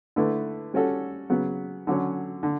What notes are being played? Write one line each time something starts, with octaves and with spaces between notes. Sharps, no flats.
D3 A3 E4 B4
G3 C#4 F#4 A4
C#3 F#3 B3
D3 F#3 C#4
D3